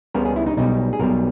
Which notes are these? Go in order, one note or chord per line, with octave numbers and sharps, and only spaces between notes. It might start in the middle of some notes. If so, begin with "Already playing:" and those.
C#2 C#3 G3 B3 A#4
G#4
E4
D#4
B1 B2 G3 D#4
G#4
B1 B2 G3 A#4